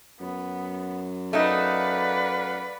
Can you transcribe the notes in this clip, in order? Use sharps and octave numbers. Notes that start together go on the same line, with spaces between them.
F#2 B3
A3 D#4 B4 D5 F5 F#5